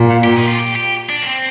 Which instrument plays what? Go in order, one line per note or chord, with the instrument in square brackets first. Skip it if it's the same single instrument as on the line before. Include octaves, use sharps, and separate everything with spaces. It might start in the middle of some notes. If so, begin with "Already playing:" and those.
Already playing: [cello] A#2
[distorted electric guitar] G4
D#4
F4
G4
G4
D4
A#3
C4